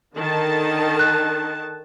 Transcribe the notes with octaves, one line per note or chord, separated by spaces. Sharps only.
D3 D#3 A5
F#6